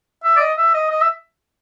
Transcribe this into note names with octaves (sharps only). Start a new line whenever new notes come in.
E5
D5
D#5
E5
D#5
D#5
E5